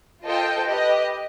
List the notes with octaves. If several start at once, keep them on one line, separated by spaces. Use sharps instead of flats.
F4 A4 C5 D#5 G5
G4 B4 D#5